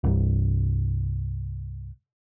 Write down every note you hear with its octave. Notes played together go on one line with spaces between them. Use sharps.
C2 G2